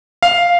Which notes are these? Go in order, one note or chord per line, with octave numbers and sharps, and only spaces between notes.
F5